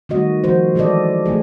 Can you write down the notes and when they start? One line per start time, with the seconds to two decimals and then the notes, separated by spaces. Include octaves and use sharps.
0.09 D#3 G3 A3 F#4 D#5
0.44 F3 F#4 C5
0.75 E3 G#3 A4 C5 D5 D#5
1.26 F#3 A3 G#4